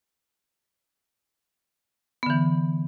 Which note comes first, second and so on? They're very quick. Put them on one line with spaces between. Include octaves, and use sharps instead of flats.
B3 D3 E3